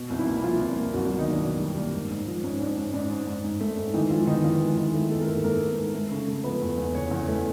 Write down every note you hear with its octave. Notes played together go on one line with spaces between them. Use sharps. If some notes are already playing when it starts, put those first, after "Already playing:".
Already playing: B2
C2
E3 E4
A#3
E4
F3 A#3 F4
C2
A#3
C2 F#3 F#4
F#3 F#4
B2
D#3 D#4
A#3 D4
B2 D4
G3
A#3
G#2
G#2
F3
G#2 C#4
G#2 D4
G#2 C#4
G#2 D4
G#2
G#2
G#2
A3
G#2
D#3 E3 D#4
F3 G#3 F4
D#3 B3 D#4
E3 F3 F4
E3 G#3 E4
D#3 B3 D#4
A3 B3 A4
G#3 A3 A4
A#4
G#2 A3 A4
G#2 A#3 A#4
B3
G#2
A3
C#3
A3
F3 B3 B4
E2
E2
C#3 C#4 C#5
E2
A3